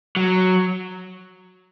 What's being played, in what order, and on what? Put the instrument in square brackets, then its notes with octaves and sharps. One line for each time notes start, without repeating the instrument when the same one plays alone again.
[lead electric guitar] F#3